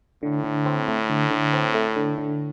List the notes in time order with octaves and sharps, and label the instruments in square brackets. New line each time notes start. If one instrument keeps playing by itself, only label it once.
[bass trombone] A2 [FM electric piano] D3
[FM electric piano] D3
C4
A3
D3
D3
C4
A3
D3
D3